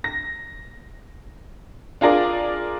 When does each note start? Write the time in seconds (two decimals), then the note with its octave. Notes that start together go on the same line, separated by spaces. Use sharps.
0.04 A#6
2.01 D4 F4 G#4 A#4 D5